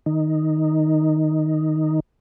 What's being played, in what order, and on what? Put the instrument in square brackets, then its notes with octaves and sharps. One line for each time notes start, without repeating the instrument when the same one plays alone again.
[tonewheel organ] D#3 D#4